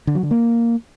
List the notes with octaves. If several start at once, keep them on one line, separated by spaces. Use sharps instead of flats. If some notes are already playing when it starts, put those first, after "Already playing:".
D3
F#3
D3
A#3